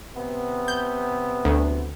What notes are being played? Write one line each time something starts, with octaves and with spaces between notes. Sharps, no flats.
C3 B3
G6
D2